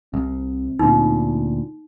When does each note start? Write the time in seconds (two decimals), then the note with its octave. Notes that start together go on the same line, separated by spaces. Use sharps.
0.14 C2 C4
0.79 D2 A#2 D#4